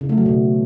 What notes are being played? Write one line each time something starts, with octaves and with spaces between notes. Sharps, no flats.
C#3
A3
F#3
B2